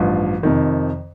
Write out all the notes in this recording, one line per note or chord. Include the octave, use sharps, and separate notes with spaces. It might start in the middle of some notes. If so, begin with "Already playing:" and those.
Already playing: A1 G2 F3
F2 C3 D#3